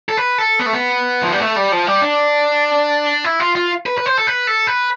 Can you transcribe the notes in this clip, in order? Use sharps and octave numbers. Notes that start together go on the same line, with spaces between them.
A4
B4
A4
B3
A3
B3
F3
G3
A3
G3
F3
G3
D4
E4
F4
F4
B4
B4
C5
A4
B4
A4
B4